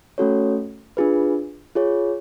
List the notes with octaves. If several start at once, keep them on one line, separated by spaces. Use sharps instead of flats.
A3 C#4 F#4 A4 C#5
D4 F4 G#4 B4
F4 G#4 C#5